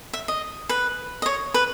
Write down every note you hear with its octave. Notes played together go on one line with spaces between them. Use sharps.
E5
D#5
B4
D#5
C#5
B4